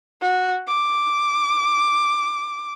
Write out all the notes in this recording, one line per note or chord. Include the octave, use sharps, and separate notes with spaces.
F#4
D6